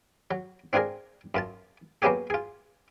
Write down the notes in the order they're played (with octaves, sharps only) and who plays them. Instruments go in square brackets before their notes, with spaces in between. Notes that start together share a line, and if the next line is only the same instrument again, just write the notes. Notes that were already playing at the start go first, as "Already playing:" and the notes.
[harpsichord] F#3
C4 D4 F4 G#4 A#4
F#2 F4 A5
F#3 A#3 B3 C#4 G4 G#4
F4 G#4